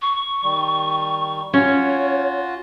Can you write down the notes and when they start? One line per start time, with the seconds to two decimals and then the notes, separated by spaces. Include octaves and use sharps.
0.02 C#6
0.44 D#3 G3
1.54 C#4 F4 F#4 C#5